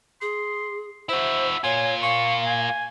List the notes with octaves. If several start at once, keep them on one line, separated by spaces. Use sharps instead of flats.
G#4 C6
E4 F#4 C5 E5
A#3 F4 C#5 G#5
F5 C#6
G#5